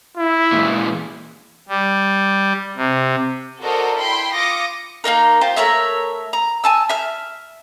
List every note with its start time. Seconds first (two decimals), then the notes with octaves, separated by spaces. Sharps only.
0.17 E4
0.52 A#2 E3 G#3
1.68 G3
2.77 C3
3.62 F#4 A4 A#4 C5 D5 D#5
3.98 E4 G5 B5 C6
4.36 F4 D6 D#6 A#6 C#7
5.04 A#3 D4 D#4 A#4
5.41 F4 G4 C5
5.56 A3 A#4 C#5 E5
6.33 A#5
6.64 G#5 A5 E6
6.89 E5 F6